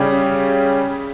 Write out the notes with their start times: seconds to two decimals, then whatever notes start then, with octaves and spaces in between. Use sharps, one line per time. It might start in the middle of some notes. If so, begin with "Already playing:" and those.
Already playing: C#3 G3 C#4 G4